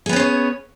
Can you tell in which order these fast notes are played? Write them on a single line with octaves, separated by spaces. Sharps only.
G#4 B3 C#4 C5 C#5